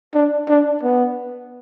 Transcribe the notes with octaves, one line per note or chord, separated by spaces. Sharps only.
D4
D4
B3